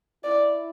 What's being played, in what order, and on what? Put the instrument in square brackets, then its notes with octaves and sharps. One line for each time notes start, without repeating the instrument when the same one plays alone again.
[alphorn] E4 [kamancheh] D5